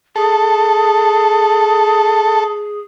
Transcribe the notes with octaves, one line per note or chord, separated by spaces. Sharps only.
G#4 A4